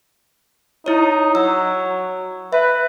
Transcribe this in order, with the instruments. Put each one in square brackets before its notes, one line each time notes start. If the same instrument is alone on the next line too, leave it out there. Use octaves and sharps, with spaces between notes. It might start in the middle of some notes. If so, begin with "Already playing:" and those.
[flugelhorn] D#4 [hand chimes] E4 C#5
[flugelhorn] F#3 [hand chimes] E6
[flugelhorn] B4 [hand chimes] E5